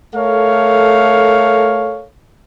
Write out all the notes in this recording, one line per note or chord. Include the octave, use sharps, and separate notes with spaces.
A3 A4 A#4 C#5 F5